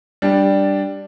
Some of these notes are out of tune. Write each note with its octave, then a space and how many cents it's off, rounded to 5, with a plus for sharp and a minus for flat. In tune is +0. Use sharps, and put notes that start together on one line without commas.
G3 +0 D4 +0